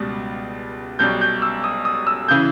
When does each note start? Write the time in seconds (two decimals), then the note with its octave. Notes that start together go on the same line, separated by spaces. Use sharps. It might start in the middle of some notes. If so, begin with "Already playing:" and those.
Already playing: C#2 B2 G3
0.99 B1 B2 G3 G6
1.21 G6
1.42 E6
1.64 D#6
1.85 D#6
2.07 E6
2.28 C#3 E3 G6